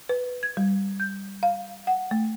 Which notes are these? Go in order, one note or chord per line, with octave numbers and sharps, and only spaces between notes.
B4
G#6
G3
G6
F5
F#5
A3